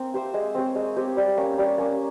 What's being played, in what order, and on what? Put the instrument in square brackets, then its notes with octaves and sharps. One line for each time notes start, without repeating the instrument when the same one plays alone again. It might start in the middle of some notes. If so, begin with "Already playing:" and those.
Already playing: [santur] A#3 C4
G4 C5 E5
G#3
C4 G4 C#5
G#3
C4 G4 C#5
G3
A#3 C#4
G3
A#3 C#4